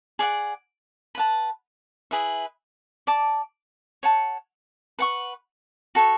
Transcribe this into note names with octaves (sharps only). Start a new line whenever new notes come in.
G#4 D5 F#5
B4 F#5 A5
E4 G#4 B4 E5
D5 A5 D6
C#5 F#5 A5
B4 F#5 C#6
F#4 A4 C#5